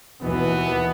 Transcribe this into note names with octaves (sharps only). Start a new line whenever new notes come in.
D#2 B2 E3 B3